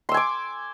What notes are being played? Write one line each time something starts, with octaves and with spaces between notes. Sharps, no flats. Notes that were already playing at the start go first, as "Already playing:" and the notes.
G#5 C6 D6 E6